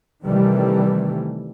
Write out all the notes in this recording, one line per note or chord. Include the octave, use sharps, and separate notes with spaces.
C3 D#3 E3 G3 A3